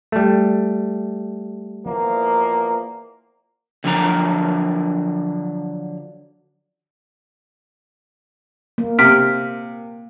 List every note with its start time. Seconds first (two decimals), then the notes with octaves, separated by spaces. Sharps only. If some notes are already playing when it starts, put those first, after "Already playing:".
0.12 G3 A3
1.86 E2 F3 A#3
3.84 D3 F3 F#3 D4 E5 A#5
8.78 A#3
8.99 C3 F6 B6 D7